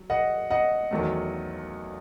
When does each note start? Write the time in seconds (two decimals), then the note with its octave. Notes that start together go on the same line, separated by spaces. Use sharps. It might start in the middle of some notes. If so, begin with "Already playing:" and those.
Already playing: F#3
0.10 D#5 F#5
0.50 D#5 F#5
0.91 E2 D#3 F#3 A3